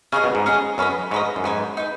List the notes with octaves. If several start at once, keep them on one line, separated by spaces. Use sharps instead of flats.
C#3 C#4 G#4 D#5
B2
G#2
C#4 G#4 D#5
F#2 C#4 B4 D#5
G#2 C#4 B4 D#5
F#2
G#2 D#4 B4 G#5
D#4 B4